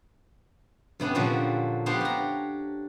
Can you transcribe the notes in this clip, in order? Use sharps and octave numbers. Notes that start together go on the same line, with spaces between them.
G2 C3 B3 C#4 D4
A#2 D3 F3 F#3 G4
B3 D4 G4 C5 C#5 F5
G4 A#5